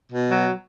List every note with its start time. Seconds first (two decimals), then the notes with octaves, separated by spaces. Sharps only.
0.11 B2
0.28 F#3